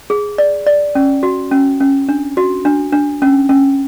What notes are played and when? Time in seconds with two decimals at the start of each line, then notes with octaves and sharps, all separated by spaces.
0.10 G#4
0.38 D5
0.66 D5
0.95 C#4
1.23 F#4
1.51 C#4
1.80 C#4
2.09 D4
2.37 F#4
2.65 D4
2.93 D4
3.22 C#4
3.49 C#4